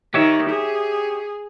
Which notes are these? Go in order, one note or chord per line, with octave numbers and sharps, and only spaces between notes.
D#3 G4 C#5 E5
G#4